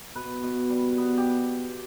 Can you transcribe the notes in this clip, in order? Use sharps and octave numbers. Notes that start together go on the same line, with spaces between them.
B2 B4
B2
G3
B3
G4